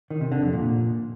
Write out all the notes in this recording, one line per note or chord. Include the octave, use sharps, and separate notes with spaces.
D#3
C3
D3
F2
A#2